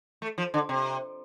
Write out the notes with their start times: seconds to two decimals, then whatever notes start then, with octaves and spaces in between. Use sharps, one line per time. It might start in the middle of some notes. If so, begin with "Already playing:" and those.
0.22 A3
0.38 F3
0.54 D3
0.69 C3